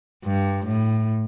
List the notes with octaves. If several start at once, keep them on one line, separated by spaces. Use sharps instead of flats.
G2
A2